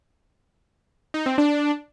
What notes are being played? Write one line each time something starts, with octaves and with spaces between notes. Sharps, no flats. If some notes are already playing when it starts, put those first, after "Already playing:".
D#4
C4
D4